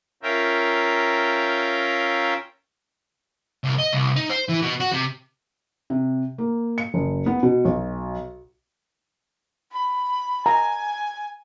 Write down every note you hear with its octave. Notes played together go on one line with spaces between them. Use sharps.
C#4 F4 A#4 E5 G5
C2
D#5
C2
D#4
C5
E3
B2
F#4
C3
C3
A#3
C#7
F#1
B3
B2
B1
B5
G#5 A#5